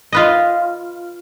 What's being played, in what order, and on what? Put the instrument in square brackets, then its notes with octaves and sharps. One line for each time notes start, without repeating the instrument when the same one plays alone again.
[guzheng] F4 B4 D#5